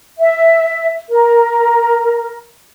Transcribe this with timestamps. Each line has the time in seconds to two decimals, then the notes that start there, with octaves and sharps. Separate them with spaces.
0.19 E5
1.09 A#4